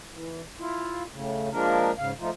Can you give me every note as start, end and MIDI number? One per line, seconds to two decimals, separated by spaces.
0.13 0.41 52
0.59 1.03 64
0.59 1.03 65
1.11 1.49 45
1.11 1.49 49
1.52 1.91 53
1.52 1.91 56
1.52 1.91 58
1.52 1.91 62
1.52 1.91 70
1.98 2.12 44
1.98 2.12 49
1.98 2.12 77
2.20 2.30 53
2.20 2.30 57
2.20 2.30 63
2.20 2.30 65